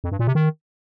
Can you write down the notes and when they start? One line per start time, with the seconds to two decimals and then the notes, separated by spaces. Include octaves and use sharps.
0.04 F2
0.12 G2
0.19 A#2
0.27 C3
0.35 D#3